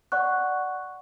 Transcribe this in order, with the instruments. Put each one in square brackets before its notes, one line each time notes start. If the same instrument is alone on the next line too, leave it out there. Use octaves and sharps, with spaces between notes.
[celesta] D5 F#5 C#6 F#6